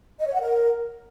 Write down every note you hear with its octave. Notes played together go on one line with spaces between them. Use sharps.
D#5
C#5
F#5
A#4